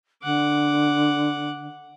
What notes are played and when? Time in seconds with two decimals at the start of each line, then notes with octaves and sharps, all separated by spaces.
0.23 D3 F#5 D6